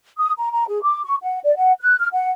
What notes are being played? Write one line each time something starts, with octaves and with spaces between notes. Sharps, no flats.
D#6
A#5
A#5
G#4
D6
C#6
F#5
D5
F#5
F#6
F6
F#5